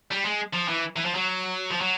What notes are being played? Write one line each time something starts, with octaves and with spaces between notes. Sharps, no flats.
G3
G#3
F3
E3
E3
F3
F#3
F3
F#3